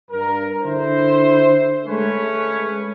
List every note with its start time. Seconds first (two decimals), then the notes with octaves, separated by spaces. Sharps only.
0.11 G2 A#4
0.62 D3 E4 C5
1.86 G#3 A3 C#4 B4 C#5